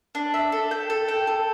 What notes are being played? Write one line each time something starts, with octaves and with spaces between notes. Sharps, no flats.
D4
E5
A4
G5
A4
G5
A4